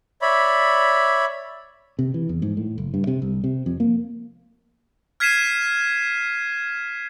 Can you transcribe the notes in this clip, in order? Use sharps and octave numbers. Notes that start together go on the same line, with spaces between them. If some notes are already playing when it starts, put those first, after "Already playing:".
C#5 D5 E5 B5
C3
E3
E2
G#2
A2
F#1
G2
C3
C2
C3
F2
A#3
F6 G#6 B6 C7 D#7 E7